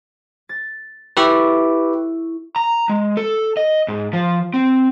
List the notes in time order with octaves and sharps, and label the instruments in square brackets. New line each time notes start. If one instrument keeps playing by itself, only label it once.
[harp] A6
[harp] E4 A4 C#6 [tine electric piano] G4 B4
[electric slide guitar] A#5
G#3
A4
D#5
G#2
F3
C4